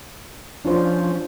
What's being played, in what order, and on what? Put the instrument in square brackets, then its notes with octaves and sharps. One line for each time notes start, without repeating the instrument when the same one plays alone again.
[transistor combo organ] F3 C#4 [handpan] D4 F4 C5